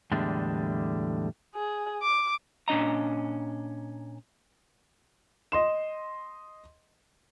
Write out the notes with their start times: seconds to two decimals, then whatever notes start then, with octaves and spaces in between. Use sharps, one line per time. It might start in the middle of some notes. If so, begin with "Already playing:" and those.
0.11 E2 A2 D3 G3 G#3 D4
1.55 G#4
2.02 D6
2.68 A#2 C#4 D4 D#5 A#5
5.52 D#5 C6 E7